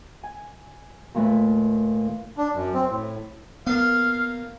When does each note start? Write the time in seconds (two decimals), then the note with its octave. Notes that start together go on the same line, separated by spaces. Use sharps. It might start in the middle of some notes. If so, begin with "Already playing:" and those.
0.23 G#5
1.15 D#2 A#2 A3 B4
2.37 D4
2.54 F#2
2.74 C4
2.89 A2
3.67 A#3 B3 F4 F5